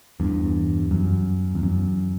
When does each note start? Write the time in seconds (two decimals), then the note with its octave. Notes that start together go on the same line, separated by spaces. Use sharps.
0.20 E2 G2
0.91 F#2
1.55 E2
1.63 F#2